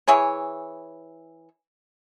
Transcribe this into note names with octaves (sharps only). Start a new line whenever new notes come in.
E3 E4 G#4 C#5